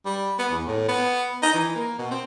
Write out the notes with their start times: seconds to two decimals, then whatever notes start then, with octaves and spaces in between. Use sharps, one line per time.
0.05 G3
0.39 B3
0.51 E2
0.67 A2
0.88 B3
1.42 D#4
1.54 E3
1.75 A#3
1.98 B2
2.11 C4